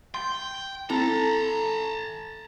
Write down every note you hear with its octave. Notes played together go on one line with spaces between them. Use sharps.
G5 C6
C4 E4 A4 A5 A#5